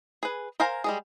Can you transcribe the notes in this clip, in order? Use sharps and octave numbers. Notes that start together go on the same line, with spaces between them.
G#4 B4
A#4 C5 F5 G#5 A#5
G3 G#3 G#4